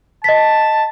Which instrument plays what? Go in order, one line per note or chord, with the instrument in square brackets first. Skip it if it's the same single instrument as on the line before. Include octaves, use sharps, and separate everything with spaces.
[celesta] D#5 B6 [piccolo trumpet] A5